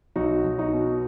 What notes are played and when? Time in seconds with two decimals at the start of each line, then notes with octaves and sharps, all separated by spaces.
0.16 B1 D#4 F#4
0.44 B1
0.59 D#4 F#4
0.73 B2